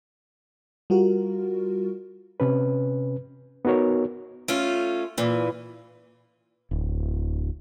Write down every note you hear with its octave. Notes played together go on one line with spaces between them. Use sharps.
G3 F4 F#4 A#4
C3 C#4 B4
B3 D#4 F#4 A#4 C#5
A3 C#4 F4
A#2 E3
D1